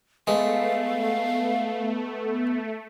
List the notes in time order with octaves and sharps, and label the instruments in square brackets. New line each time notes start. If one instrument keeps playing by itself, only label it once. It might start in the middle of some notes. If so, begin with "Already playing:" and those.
[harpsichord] G#3 [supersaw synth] A3 [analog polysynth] B3 [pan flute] F5